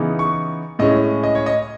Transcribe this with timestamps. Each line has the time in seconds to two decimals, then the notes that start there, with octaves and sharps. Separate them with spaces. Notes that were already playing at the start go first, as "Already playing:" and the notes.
Already playing: C#3 E3 B3 D#4
0.19 C#6
0.79 A2 G#3 C#4 D#5
1.23 D#5
1.35 C#5
1.46 D#5